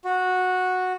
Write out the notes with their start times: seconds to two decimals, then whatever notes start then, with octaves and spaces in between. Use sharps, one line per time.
0.05 F#4